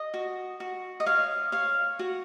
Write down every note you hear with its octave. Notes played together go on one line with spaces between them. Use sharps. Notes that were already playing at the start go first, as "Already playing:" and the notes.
Already playing: D#5
F#4
F#4
D#5
C#5 F5
C#5 F5
F#4